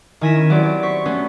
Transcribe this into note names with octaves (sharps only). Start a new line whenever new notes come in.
D#3 E4 G#5 A#6 B6 E7
C#4
F#3 B3 C4 E4 G4 D5
D5
C5 C#6 B6
A3 B3 C#4 D4